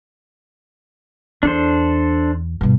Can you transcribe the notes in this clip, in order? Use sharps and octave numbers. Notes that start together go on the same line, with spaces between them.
E2 D4 A4 C5
G2 B2